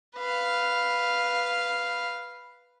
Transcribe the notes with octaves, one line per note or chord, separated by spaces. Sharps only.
B4 F5